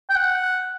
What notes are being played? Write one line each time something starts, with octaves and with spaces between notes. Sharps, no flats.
G5
F#5